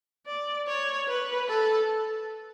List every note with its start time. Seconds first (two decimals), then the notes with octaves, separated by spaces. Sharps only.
0.26 D5
0.67 C#5
1.08 B4
1.48 A4